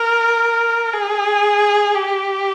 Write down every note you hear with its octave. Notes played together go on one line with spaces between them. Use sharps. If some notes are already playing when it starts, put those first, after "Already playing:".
Already playing: A#4
G#4
G4